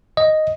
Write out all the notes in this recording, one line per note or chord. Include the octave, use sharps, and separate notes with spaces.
D#5